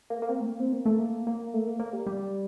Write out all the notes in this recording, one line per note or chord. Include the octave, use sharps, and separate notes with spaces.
A#3
A#3
C4
A3
A#3
C4
A#3
A3
A#3
A#3
A3
A#3
A#3
G3
G3